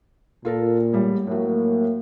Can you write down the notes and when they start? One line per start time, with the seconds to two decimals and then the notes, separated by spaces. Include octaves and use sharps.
0.45 A#2 F4 A4 A#4
0.93 A1 G3 G#3
1.27 A2 F#3 A#3